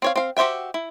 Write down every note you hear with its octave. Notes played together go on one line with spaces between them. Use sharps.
C4 C#5 F5
C4 F5
F#4 G4 C5 E5 G5
E4